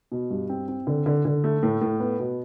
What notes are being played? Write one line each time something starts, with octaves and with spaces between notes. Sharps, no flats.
B2
G2
C4
C4
D3
D3
D3
A3
A2
A2
B3
B2